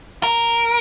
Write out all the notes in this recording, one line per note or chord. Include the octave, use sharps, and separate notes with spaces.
A#4